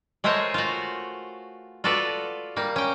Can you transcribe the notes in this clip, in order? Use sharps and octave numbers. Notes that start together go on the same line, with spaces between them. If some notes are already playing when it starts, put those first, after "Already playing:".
G#3 A3 G#4 A#4 C5 C#5
F4 F#4
F4 F#4 A4 B4 D5
G3 A#3
C#4 G5